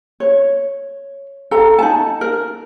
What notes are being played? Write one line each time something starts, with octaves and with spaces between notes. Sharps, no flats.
C#5
A4 A#5
D#4 A5
A#4